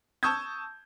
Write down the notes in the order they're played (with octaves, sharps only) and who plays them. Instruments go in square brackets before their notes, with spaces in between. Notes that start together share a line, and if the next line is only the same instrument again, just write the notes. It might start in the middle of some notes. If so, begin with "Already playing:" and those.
[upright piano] A5 C#6 D#6 E6 G6 G#6